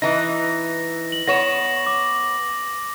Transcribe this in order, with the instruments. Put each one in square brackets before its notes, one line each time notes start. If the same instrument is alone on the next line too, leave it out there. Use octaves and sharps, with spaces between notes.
[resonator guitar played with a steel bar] E3 D#4 [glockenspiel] A#6
[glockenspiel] F#7
[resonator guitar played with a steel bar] B3 C#5 [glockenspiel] A#6 E7
[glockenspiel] D6